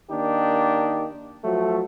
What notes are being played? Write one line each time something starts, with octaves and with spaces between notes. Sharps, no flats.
D#3 A#3 D4 D#4 G4
F3 F#3 A3